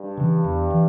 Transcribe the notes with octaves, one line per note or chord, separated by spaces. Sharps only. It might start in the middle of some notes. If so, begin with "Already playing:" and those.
Already playing: G2
C#3 E3
E2
E3